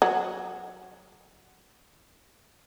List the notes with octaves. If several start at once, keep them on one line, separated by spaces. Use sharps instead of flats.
F#3